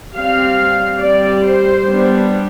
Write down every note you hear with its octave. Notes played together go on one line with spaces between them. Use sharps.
G3 C4 F5
G3 C4 D5
C5
G3 B3 D4